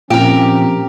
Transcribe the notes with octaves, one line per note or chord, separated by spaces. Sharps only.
A#2 F3 C4 C#4 G4 A#4